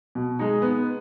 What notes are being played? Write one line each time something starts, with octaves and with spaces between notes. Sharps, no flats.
B2
G#3 D#4
B3